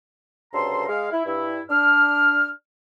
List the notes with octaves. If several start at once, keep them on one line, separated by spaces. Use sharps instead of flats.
D2 G2 C#3 A4 A#5 C6
G#3 F5
E4
G2 E4
D4 F6